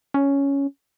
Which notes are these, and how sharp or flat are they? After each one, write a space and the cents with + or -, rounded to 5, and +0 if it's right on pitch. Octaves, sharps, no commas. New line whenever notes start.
C#4 +5